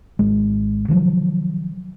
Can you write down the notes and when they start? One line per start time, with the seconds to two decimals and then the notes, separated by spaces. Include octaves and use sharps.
0.19 G#1 G#3
0.88 C3 D#3 F3 F#3